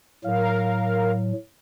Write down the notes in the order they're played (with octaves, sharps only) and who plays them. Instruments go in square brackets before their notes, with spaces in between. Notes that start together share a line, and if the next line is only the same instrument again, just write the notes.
[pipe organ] A2 F#3 [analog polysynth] A#4 F5